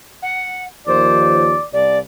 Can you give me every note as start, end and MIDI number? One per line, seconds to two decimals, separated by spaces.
0.22 0.64 78
0.87 1.55 39
0.87 1.55 53
0.87 1.43 72
0.87 1.65 74
1.73 1.99 36
1.73 1.98 74